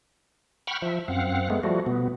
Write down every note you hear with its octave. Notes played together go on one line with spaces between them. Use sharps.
F#5 G5 B5 C#6 F6
F3 E5
F#2 C4 F5 F#5
G#3 A3 B3
F3 G3 A3 F#4
B2 B3